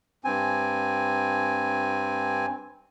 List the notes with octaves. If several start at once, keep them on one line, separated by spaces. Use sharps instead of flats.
G2 C4 G#5